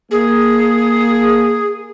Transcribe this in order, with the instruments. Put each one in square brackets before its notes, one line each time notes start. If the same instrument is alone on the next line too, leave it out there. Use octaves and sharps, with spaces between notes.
[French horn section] A#3 [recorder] G#4